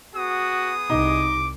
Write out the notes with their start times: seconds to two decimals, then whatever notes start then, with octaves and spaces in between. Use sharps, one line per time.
0.15 B3 F#4 G#4 D#6
0.90 C2 D#4 D6